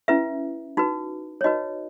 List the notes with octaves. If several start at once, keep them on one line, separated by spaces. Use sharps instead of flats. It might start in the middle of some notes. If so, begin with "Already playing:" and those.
C#4 E4 B4 E5
D#4 F#4 B4
C#5
D#4 F#4 B4 D#5